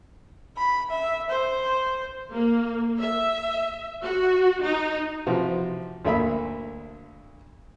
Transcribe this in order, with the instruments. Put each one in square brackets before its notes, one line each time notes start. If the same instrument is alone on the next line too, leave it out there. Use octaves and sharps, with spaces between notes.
[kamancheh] B5
E5
C5
[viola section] A#3
E5
F#4
D#4
[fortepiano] C3 E3 F3 F#4
D2 D3 A#3 E5 B5 E6